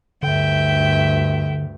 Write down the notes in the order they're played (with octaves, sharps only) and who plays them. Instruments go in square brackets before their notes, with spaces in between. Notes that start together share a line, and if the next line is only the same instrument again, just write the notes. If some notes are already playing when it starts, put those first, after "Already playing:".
[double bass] D2 G2 [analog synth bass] D3 [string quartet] E5 G5